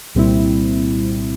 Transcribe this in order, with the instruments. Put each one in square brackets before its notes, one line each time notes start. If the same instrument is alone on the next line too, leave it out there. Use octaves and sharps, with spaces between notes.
[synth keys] C2 A#2 G3 C4 E4